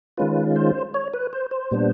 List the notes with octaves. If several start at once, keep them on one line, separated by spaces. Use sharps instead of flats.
D#3 G#3 C#4 F4 B4
C5
C#5
B4
C5
C5
A#2 G3 B3 D4